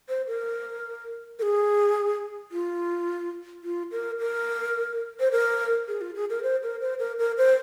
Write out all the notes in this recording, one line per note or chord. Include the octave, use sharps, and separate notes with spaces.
C5
A#4
A#4
G#4
F4
F4
A#4
A#4
C5
A#4
G#4
F4
G#4
A#4
C5
A#4
C5
A#4
A#4
C5